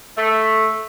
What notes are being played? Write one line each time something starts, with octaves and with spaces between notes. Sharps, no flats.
A3